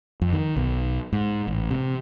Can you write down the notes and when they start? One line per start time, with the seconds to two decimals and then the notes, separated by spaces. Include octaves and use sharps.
0.21 F2
0.33 D#3
0.56 B1
1.13 G#2
1.47 A1
1.71 C3